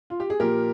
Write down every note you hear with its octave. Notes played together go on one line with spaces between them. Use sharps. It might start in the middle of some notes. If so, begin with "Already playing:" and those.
F4
G4
G#4
A#2 F3 G4 A#4